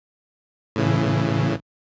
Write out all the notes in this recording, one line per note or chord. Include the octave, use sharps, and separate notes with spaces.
A2 C#3 E3